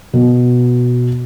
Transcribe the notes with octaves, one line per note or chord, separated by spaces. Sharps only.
B2